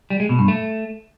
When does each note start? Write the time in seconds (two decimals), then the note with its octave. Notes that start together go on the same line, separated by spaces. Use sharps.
0.10 G3
0.20 G#3
0.29 B2
0.39 G2
0.48 A3